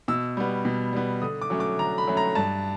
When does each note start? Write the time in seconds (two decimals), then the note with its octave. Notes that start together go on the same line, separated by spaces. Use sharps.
0.08 B2 E6
0.37 G3 B3
0.65 B2
0.93 G3 B3
1.22 D3 D#6
1.42 D6
1.50 F#3 A3 C#4
1.60 D6
1.79 D3 A#5
1.98 B5
2.07 F#3 A3 C#4
2.17 A#5
2.35 G2 A5